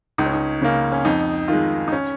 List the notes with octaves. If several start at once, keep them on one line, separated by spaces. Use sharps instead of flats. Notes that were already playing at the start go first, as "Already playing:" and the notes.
C#2 D#4
C#4
D#4
C#3 A#3 C#4
C#4
F2 D#4
D#3 G#3 F4
D#4
C#4